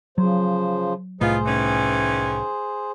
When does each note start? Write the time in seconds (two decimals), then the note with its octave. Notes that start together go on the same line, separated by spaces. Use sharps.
0.18 C#3 F3 F#3 C5
1.21 C2 A2 A3 B3 D#4 F4 G#4 C5
1.46 D#3 E3 C#4